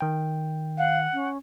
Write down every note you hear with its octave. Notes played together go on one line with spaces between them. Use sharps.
D#3 G5
F5 F#5
C#4